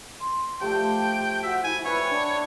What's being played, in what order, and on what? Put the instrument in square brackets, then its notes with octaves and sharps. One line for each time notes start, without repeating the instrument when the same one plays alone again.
[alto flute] C6
[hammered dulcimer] F3 A3 [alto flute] G4 [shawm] G5
[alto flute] F#4 [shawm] E5
[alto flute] E4 [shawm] G#5
[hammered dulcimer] E4 G5 [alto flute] B4 [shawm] C#5
[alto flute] D4